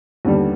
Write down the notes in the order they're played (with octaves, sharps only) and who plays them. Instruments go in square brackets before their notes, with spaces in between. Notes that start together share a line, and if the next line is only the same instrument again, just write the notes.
[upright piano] D#2 D3 G3 B3